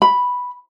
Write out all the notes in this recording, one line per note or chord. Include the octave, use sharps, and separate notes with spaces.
B5